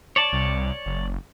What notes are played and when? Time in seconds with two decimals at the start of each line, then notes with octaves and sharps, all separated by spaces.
0.16 C#5 D5 A5
0.32 C2
0.86 F#1